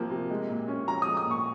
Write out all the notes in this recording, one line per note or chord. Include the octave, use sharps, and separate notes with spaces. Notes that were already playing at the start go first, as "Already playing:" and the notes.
Already playing: C3 F3 A#3
C3
G#3
A#2
C#4
F3 A#5
D#6
G#3
D#6
A#2 C#6